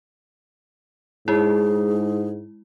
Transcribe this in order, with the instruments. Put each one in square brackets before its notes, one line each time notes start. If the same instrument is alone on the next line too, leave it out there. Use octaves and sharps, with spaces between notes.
[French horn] G#2 [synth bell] G#3 E4 [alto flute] G#4